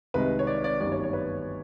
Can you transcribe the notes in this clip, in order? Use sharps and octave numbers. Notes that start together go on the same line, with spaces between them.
C2 C3 D#3 G#3 B4
C#5
D5
D5
G1 F#2 D#3 G3 D5
C#5
C#5
B4